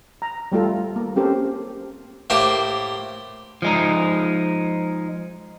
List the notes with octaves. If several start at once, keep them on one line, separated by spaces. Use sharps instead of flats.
A#5
G3 A3 F4 A4
A#3
C4 C#4 G4 A4 A#4 C5
A2 A#3 G4 C5 C6
F3 G#3 D#4